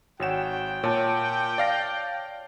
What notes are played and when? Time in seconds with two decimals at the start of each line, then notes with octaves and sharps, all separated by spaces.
0.20 G#1 F#4 C#5 F#5 G5 E7
0.84 A#2 C#5 A5
1.58 D5 F5 A#6